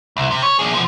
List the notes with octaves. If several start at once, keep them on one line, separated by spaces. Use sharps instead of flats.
C2
C3
C#5
D4 G#4
B2 F3